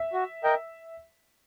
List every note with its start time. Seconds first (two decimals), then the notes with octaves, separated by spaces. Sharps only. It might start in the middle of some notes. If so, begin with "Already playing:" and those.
Already playing: E5
0.13 F#4
0.44 A#4 D#5 G5